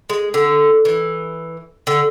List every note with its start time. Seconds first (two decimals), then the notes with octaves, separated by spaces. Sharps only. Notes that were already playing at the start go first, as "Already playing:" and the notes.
0.10 G#3
0.34 D3
0.85 E3
1.87 D3